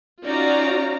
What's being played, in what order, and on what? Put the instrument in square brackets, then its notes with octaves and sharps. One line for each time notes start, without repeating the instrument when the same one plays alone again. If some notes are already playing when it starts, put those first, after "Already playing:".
[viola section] C#4 D#4 F4 F#4 D5 A#5